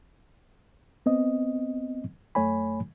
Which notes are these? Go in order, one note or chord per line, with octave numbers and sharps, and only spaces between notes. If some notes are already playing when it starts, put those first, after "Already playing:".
B3 C4 D#5
F#2 A3 C#5 G#5 B5